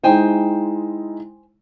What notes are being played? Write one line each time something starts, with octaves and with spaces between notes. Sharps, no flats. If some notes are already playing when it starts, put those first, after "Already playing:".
G#3 D#4 E4 C5 G5 G#5